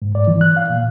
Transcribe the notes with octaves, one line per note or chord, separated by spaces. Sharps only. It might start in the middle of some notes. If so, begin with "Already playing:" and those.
G#2
D5
E3
F#6
F5
A#2